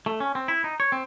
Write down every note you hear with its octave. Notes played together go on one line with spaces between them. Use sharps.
A3
C#4
C4
E4
D#4
C#5
C4